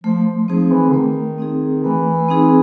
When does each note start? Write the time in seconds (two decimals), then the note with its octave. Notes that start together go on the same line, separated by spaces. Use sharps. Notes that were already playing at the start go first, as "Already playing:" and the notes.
0.04 F3 A3
0.26 F3
0.48 F3 C4 D#4 G#4
0.71 E3
0.89 D3
0.93 D#3 A3
1.38 C4 D#4 G#4
1.83 E3 A3
2.29 C4 D#4 G#4